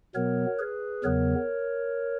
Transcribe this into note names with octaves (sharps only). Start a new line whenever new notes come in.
B2 F#3 B3 A#4 C#5
G#4 B4
E2 C#3 F#3 B3 A#4 C#5